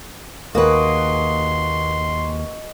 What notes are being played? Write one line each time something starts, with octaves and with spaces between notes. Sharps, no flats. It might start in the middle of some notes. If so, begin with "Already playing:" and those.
D#2 A#3 F#4 G#4 B4 D#5 C6